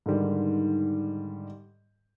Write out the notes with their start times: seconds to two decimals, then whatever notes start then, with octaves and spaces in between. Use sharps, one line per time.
0.06 G#2 D3 D#3 G3